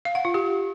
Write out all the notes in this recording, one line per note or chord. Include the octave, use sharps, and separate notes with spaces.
F5
F#5
F4
G4